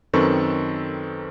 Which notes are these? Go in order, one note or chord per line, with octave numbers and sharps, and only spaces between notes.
F#2 D#3 C4 A4 B4 C#6